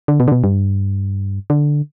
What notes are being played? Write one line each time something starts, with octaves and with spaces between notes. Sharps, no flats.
D3
B2
D3
B2
G2
D3